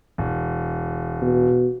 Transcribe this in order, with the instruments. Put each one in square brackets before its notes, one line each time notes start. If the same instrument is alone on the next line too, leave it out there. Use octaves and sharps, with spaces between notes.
[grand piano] E1
[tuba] B2